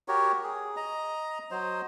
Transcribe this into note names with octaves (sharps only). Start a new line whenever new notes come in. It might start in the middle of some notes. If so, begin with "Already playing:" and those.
F#4 G4 A#4 C#5
G#4
D#5 A#5
F#3 C5 D#5